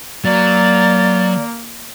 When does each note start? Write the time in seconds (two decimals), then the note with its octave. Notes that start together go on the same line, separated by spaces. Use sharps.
0.25 F#3 A#3 D5 A6